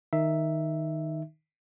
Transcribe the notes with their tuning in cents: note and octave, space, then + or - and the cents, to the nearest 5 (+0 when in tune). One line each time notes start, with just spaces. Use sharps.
D#3 +0 D#4 +0 E5 +0